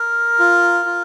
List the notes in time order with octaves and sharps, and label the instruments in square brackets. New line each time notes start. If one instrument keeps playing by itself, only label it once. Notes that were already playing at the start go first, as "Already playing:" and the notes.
Already playing: [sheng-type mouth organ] A#4
F4
F4